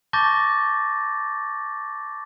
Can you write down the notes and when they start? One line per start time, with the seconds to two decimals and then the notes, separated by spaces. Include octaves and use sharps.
0.13 A5 C#6 D6 G6 A6 A#6